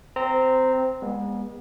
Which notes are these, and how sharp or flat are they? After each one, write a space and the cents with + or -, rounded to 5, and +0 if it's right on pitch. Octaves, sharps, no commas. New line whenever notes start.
C4 -10 A#5 -15
G#3 -35 B3 -35